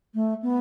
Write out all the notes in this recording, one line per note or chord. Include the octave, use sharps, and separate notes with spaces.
A3
B3